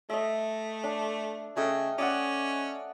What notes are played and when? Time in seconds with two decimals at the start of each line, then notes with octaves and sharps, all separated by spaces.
0.10 A3 D#5 E5
0.84 D4
1.57 C#3 A3 D#5 G5
1.98 C#4 D5 D#5 F#5